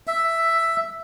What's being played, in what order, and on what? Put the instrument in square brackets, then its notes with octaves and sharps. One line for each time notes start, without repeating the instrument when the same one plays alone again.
[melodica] E5